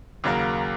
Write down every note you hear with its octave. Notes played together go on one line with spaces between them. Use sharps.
D#2 C#3 F#3 A#3